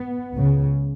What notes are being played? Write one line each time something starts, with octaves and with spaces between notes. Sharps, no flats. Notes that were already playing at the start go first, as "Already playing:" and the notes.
Already playing: B3
C#2 C#3